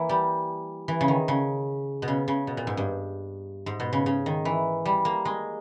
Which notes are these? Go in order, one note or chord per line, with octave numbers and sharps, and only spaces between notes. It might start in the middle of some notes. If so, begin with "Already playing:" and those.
Already playing: E3 A#3
G3
E3
C#3
D#3
C#3
B2
C#3
C#3
B2
A#2
G#2
G2
G#2
B2
C#3
C#3
D#3
E3
G3
A#3
G#3